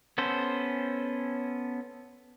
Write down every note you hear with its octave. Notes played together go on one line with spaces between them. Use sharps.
B3 C#4 A4 C5